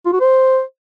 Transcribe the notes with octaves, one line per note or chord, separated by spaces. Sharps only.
F4
F#4
C5